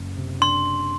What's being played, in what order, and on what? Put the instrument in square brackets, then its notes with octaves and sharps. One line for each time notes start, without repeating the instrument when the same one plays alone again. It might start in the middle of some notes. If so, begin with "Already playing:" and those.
Already playing: [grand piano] F#1
C3
[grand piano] D4 [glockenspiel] C6